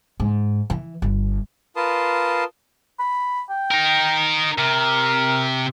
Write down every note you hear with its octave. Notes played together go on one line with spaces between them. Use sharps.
G#2
E3
G1
F4 A#4 B4 A5 C6 D#6
B5
G5
D#4 A#4
C3 A#4